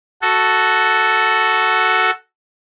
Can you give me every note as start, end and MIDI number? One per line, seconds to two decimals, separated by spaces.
0.22 2.11 66
0.22 2.11 69